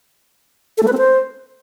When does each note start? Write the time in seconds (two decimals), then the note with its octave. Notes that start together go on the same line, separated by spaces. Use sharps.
0.77 A4
0.83 A3
0.88 B4
0.93 C4
0.98 C5